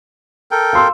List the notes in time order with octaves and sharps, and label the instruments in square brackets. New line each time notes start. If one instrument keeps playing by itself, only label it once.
[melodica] A4 A#4 G5
[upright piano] F5 C6 E6